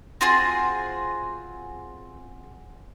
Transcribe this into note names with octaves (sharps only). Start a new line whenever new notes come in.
C4 F4 F#4 G#4